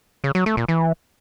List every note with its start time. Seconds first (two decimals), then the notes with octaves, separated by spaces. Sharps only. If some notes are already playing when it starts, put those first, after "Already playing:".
0.24 C#3
0.35 F#3
0.46 A3
0.57 A#2
0.68 E3